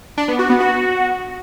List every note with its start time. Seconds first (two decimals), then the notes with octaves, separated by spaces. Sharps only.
0.18 D4
0.28 B3
0.39 F#4
0.49 B3
0.60 F#4